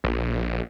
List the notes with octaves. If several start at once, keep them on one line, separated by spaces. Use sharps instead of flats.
A#1